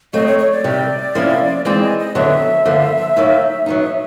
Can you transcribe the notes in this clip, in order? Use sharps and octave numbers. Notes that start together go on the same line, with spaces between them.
F#3 A3 C4 D#5
C#5
C#5
D5
C3 D#3 G3
C3 F3 A#3 C#4 E4
E3 G#3 C4 D#4 G#4 D5
D#5
D#5
F2 D3 F#3 B3 D4 E5
G2 D3 F3 A#3
D#2 D#3 F#3 A#3
F#3 B3 D#4